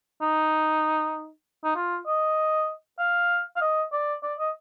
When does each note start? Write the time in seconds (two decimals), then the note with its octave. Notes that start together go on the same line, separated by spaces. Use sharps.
0.21 D#4
1.64 D#4
1.75 F4
2.06 D#5
2.99 F5
3.56 F5
3.61 D#5
3.92 D5
4.23 D5
4.39 D#5